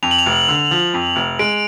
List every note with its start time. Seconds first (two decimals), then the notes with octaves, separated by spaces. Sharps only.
0.03 F2 F7
0.11 F#7
0.18 F7
0.26 F1
0.48 D3
0.71 F3
0.94 F2
1.16 F1
1.39 G#3 D7